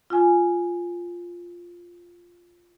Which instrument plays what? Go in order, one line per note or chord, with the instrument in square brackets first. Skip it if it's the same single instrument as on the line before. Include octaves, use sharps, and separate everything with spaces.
[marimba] F4 G#5